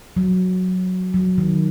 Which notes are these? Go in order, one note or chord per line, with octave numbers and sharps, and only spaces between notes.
F#3
F#3
D#3